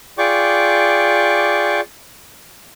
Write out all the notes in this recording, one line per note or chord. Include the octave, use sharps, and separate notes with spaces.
F4 G#4 D5 G5 C#6 D6